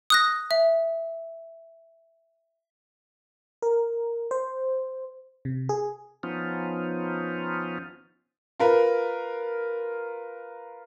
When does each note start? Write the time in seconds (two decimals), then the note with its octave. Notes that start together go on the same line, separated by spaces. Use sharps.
0.10 D#6 F#6 A#6
0.51 E5
3.62 A#4
4.31 C5
5.45 C3
5.69 G#4
6.23 F3 B3 C#4 D#4 F4
8.60 F4 A#4 B4